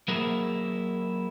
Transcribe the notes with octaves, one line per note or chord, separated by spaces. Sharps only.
F#3 A#3 E4 G#4 A#4 C5